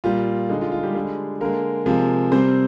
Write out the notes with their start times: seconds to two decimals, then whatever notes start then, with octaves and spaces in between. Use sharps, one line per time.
0.04 A#2 G3 F4
0.49 D3 G#3 D#4
0.61 F4
0.72 F4
0.83 G3 G4
0.95 D3 G3 G#3 G#4
1.41 D3 G#3 A#3 A#4
1.86 C3 F3 G#3
2.32 C3 G3 C4 C5